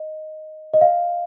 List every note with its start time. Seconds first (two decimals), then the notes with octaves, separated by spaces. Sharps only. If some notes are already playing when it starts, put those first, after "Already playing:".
Already playing: D#5
0.74 D#5
0.81 F5